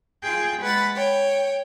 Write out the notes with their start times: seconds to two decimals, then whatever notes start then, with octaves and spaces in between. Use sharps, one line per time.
0.23 F4 G#4 G5
0.62 G#3 B4 F#5 B5 A6
0.94 C#5 G5